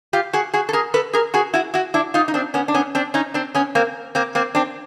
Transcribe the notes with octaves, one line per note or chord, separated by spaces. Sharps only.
F4 G4
F#4 G#4
F#4 G#4
A4
G#4 A#4
A4 B4
G#4 A#4
F#4 G#4
E4 F#4
E4 F#4
D4 E4
D#4 F4
D#4
C4 D4
B3 C#4
D4
B3 C#4
C4 D4
C#4 D#4
C4 D4
B3 C#4
A#3 C4
A#3 C4
A#3 C4
C4 D4